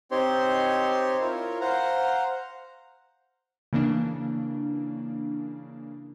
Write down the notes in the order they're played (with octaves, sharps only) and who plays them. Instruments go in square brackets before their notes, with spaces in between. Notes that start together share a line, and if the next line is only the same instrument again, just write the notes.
[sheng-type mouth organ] C4 D#4 G4 C5 C#5 C6
E4 F4 A#4 C#5
C5 F5 F#5 A#5
[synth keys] C#3 E3 A#3 D4